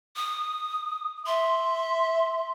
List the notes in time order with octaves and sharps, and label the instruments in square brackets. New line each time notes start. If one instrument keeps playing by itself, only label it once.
[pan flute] D#6
[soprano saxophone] E5 [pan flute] C6